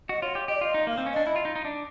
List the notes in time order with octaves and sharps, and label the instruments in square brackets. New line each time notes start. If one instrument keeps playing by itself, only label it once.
[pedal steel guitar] F#4 [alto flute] D#5
[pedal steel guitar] F4 [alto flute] C#5
[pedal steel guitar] G4
[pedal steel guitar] G4 [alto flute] D#5
[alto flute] D5
[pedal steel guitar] F4 [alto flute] D#5
[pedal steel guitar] D#4
[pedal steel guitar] A#3 [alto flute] F5
[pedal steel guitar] C4
C#4
[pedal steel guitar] D4 [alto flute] D#5
[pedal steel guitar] E4 [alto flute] D#5
[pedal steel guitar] F4
D#4
D#4
D4